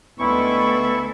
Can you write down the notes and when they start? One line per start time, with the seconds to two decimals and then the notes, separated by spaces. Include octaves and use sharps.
0.19 D2 G3 G#3 B3 D#4 E4 A4 C#6